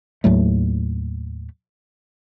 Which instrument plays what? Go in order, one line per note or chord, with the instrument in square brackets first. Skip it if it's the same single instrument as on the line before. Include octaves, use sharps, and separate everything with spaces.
[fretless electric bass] D#2 A2 F#3 A3